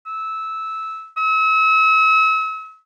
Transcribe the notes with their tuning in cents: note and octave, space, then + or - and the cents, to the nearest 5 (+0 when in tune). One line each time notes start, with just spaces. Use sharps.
E6 -15
E6 -40